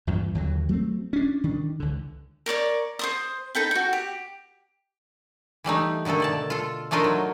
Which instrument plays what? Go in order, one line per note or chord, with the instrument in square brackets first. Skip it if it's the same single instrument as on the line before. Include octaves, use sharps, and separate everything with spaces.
[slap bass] E2 G2 A#2
D#2 D3 F#3
F#3 A3 C4
C#4 D4
D#3 D4
C#2 D3
[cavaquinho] A#4 C#5 D5 D6
C5 C6 D#6
D#4 A4 G5 B5
F#4 G5
G4
[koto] E3 G3 A3 D#4
B2 D3 D#3 A3 A4
B2 D5 A5
F4 A4
A3 D4 D#4 F4 A#4 D#5
F#3